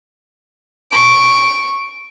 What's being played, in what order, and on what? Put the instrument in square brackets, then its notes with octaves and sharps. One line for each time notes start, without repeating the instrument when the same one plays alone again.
[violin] C#6 D7